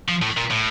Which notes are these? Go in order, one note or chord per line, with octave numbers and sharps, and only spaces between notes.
F3
A2
A#2
A2